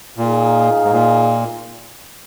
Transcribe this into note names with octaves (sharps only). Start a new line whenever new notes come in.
A#2 D#4 G#4 F5
G#2
A#2